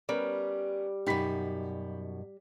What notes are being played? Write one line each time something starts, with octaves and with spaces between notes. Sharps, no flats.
G3 B3 C#4 A#4
F#2 B2 D#4 G4 B5 B6